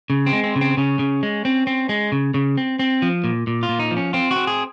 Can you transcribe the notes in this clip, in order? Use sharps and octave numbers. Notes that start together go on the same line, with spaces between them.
C#3
C4
G#3
C4
C#3
C4
C#3 C#4
C#3
G#3
C4
C4
G#3
C#3
C#3
C4
C4
F3
A#2
A#2
F4
A#2
D#4
F3
C#4
C4 F4
F#4
C4
G#4